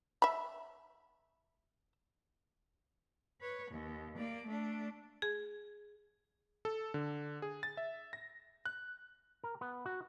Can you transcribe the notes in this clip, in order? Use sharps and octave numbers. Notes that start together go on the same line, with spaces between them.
E5 B5
B4 C#5
D#2
A#3 D5
A3 D4
G#4
A4
D3
G#4
A6
E5
A#6
F#6
A#4
B3
F#4